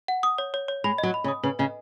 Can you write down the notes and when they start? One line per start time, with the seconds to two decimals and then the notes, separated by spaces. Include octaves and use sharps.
0.08 F#5
0.23 D#6
0.38 C#5
0.54 C#5
0.68 C#5
0.84 G#3 B5
0.98 F#3 D#5
1.14 B5
1.24 C#3
1.28 D#6
1.43 C#3 B4
1.59 C#3 D#5